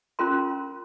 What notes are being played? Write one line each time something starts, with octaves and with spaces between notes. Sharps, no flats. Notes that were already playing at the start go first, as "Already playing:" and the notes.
C#4 F4 A#4 C6